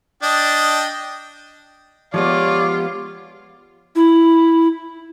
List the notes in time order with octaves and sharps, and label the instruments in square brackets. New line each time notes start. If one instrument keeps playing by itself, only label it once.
[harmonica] D4 D#5 G5
[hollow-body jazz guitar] F3 G#3 B3 [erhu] F4 [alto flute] G4 [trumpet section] C#5 D5 D6
[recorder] E4